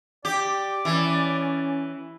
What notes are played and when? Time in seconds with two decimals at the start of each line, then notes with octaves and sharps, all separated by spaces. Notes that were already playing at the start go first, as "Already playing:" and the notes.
0.25 G4 D5
0.85 E3 C#4